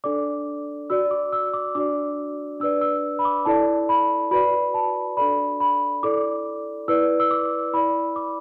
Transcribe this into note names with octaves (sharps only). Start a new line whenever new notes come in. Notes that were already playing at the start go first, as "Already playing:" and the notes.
D4 A4 D5 D6
F#4 D5 E6
D6
E6
D6
D4 F#4 D5 D6
D4 B4 D5 E6
E6
B5
D6
E4 A4 D5 A5
B5
F#4 B4 D5 B5
A5
D4 A4 D5 B5
B5
E4 A4 D5 D6
E4 B4 D5 E6
E6
D6
E4 D5 B5
D6